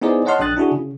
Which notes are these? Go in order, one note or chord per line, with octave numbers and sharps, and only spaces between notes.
B3 D#4 E4 G#4 C5 D5
C#5 D#5 F#5 A5 C6 F6
A#1 D4 G5 D#6 F#6 A6
D4 E4 F#4 G#4
C#3